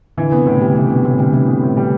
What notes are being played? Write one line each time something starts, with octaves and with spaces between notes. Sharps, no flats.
D3 E3
C3 B3
A2 C#3
D3 G3
C3 E3
B2 B3
A2 C3
D3 G3
C3 E3
B3
A2
G3